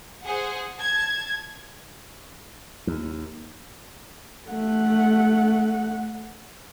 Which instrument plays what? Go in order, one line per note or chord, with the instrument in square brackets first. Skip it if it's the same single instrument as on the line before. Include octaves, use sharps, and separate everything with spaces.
[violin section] G#4 C5 F#5
A5 G#6
[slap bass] D#2
[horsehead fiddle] A3 F#5